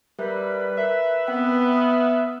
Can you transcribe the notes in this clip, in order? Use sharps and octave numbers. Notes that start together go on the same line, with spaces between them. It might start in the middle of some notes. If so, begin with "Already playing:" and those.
G3 A#4 B4 E5 F#6
A#4 E5
B3 C4 F#5 G5
D#6 F6